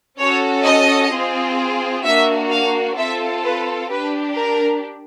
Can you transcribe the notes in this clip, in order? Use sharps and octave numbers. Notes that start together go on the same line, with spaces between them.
C#4 F#4 A4 C#5
D#5
C4 F4 G#4
A#3 D4 F#4 E5
F5
C4 F4 A4 E5
B4
D4 G4 B4
A#4